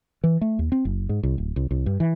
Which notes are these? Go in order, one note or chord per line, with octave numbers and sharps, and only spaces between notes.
E3
A3
D#2
C4
F#1
G#2
C2
D1
C2
C2
G2
E3